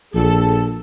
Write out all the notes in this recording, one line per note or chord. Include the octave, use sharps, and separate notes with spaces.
A#1 A4